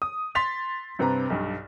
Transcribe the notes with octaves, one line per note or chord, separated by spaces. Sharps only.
D#6
C6 A6 B6 F7
G2 C3 C4 B4 A#5
B1 G2